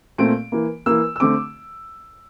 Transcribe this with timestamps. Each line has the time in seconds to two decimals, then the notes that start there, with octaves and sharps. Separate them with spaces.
0.18 A#2 A3 C4 D7
0.52 E3 A#3
0.86 E3 A#3 E6
1.16 E6
1.20 D3 A3 C4 D6